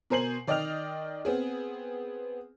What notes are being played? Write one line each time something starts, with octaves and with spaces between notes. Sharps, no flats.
B2 A#4 C5 G#5 C7 F#7
D#3 D5 D#5 G5 F6 F7
B3 C4 G#4